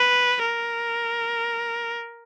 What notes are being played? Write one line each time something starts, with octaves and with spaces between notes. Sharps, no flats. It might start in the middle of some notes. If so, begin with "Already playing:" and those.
Already playing: B4
A#4